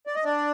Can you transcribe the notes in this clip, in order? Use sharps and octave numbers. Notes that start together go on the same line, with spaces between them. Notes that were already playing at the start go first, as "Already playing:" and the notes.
D5
D#5
D4 D5